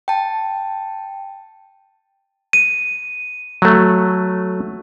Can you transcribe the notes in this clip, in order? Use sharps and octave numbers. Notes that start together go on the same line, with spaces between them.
G5 A5
D#7
F#3 A3